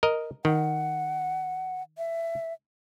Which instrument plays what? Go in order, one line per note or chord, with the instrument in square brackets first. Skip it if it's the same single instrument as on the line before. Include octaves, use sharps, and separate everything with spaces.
[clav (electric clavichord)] A#4 D#5
[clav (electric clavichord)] D#3 [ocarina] F#5
[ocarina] E5